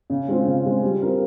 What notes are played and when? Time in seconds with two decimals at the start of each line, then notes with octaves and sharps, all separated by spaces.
0.10 C#3
0.28 G#3 C4 F4
0.46 C#3
0.65 G#3 C4 F4
0.83 G3
1.02 C4 F4 A#4